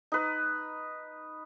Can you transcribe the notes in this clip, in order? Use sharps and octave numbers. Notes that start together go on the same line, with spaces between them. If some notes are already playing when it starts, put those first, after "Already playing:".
D#4 B4